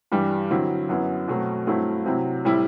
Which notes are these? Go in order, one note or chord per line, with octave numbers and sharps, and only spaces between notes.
G2 E3 G3
D3 F#3 C4 E4
F#2 F#3 B3 E4
B2 F#3 A3 C4
G2 F#3 A3 C4 E4
C3 F#3 C4 E4
A2 G3 C4 E4